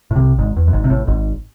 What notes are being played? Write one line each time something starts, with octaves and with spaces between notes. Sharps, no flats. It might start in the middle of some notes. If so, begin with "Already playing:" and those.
A2
C2 C3
G#1 G#2
E2
F#2
G#1 G#2
C3
A1 A2
G#1 G#2